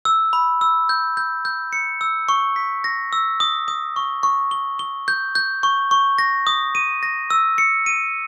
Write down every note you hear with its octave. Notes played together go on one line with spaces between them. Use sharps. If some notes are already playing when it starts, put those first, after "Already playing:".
E6
B5
E6
G6
G6
G6
C#7
E6
C#6
B6
A#6
E6
D#6
D#6
C#6
C#6
G7
G7
G6
G6
C#6
C#6
A#6
D#6
D#7
A#6
E6
C#7
D#7